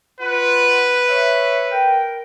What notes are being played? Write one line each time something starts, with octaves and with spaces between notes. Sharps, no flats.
F4 B4 F#5
C#5 E5
A#4 G5